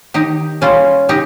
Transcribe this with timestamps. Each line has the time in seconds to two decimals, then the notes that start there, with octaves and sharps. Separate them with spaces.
0.14 D#3 D#4 G4
0.61 G3 A#3 C#4 F4
1.09 C#3 D#4 G4